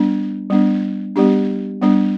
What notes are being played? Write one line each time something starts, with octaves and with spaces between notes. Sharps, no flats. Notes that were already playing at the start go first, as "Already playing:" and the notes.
Already playing: G3 B3 D4
G3 B3 D4
G3 B3 D4 G4
G3 B3 D4